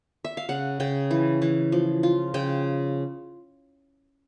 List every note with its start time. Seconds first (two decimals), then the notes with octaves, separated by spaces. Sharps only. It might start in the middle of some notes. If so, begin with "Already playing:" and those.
0.24 E5
0.37 F5
0.49 C#3 F#5
0.80 C#3 G5
1.11 E3
1.42 E3
1.72 F3
2.03 F4
2.34 C#3 G5